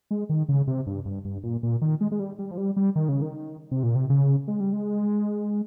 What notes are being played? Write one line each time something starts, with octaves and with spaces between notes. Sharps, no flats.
G#3
D#3
C#3
C3
G2
G2
G2
A#2
A#2
D#3
G#3
G#3
G3
G3
F3
G3
G3
D#3
C#3
D#3
C3
A#2
C3
C#3
G#3
G3
G#3